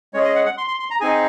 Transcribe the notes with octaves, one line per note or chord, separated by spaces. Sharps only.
G#3 C#4 G#4 C#5
D#5
F#5
F#5
C6
C6
C6
A#5
C4 D#4 G#4 G#5